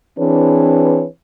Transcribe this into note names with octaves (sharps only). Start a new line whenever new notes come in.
E3 C4 D4 G#4 B4 C#5